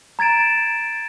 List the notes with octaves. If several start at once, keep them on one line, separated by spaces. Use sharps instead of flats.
A#5 G#6 A6 D7 E7